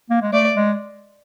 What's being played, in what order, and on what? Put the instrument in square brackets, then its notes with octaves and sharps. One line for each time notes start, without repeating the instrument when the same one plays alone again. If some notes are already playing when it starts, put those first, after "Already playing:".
[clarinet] A#3
G#3
[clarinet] A3 [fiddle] D5
[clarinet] G#3